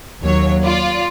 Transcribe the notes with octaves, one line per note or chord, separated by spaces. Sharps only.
D#2 F#3 C#5
F4 D5